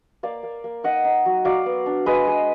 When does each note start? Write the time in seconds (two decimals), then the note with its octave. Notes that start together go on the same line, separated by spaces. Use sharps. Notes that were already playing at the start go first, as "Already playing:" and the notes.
0.23 A#3 D5 F5
0.43 A#3
0.64 A#3
0.84 D#4 D#5 F#5
1.04 D#4
1.26 F#3
1.45 F#3 D5 F5
1.66 B3
1.86 D4
2.06 G#3 B4 D#5
2.27 G#3